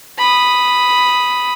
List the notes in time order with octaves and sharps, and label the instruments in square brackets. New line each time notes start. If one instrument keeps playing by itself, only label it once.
[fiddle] B5 D#6